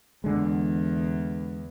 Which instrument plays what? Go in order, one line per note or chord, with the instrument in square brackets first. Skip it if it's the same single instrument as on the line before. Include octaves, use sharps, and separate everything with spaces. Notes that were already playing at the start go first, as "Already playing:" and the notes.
[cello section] E2 [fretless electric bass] D3 G#3